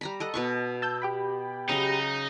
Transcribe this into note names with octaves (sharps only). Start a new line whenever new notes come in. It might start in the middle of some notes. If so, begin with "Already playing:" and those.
G3 A#5 B5
A4 D#5 F#5
B2 B4 C#6
A5 E6 G6
G4 G5 B5
C#3 F#3 D#4 A#5